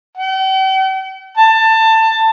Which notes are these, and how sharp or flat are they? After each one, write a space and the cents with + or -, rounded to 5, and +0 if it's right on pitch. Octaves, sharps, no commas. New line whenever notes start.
G5 -45
A5 +20